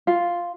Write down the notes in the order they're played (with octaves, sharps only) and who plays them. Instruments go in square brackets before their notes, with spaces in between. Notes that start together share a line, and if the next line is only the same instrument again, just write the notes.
[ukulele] F4